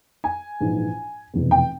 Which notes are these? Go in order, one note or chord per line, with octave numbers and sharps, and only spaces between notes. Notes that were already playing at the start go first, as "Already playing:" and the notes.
G#5
A#1 G#2 E3
F1 E2 B2
G5